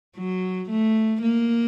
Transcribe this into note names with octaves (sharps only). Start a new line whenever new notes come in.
F#3
A3
A#3